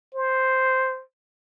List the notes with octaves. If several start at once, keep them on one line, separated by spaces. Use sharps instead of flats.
C5